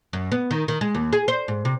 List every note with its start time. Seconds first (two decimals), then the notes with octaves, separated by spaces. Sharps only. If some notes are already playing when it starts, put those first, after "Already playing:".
0.13 F#2
0.32 B3
0.51 D#3
0.68 D#3
0.81 G#3
0.95 D#2
1.13 G#4
1.28 C5
1.48 G#2
1.65 C3